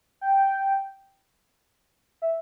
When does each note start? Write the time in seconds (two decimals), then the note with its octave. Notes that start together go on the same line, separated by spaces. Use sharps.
0.21 G5
2.22 E5